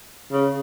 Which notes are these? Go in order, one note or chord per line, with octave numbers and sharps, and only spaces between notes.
C#3